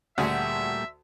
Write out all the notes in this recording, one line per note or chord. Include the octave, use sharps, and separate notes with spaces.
D2 A#2 G3 A3 F#4 G#4 E5